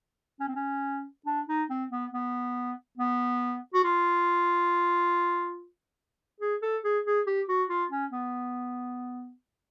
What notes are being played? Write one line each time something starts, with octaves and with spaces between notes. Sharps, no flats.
C#4
C4
C#4
D4
D#4
C4
B3
B3
B3
F#4
F4
G#4
A4
G#4
G#4
G4
F#4
F4
C#4
B3